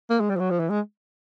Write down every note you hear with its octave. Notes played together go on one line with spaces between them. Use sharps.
A#3
G#3
G3
F3
F#3
F3
E3
G#3